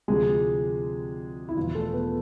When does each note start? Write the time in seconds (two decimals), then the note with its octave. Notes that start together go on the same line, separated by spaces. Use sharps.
0.08 D2 C3 F3 G#3 G#4
1.49 E4
1.57 E1 E2 B2 F3 F4
1.75 A3 A4
1.86 A4
1.93 B3 B4